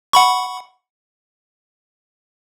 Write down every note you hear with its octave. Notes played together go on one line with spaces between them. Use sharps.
F#5 B5 C#6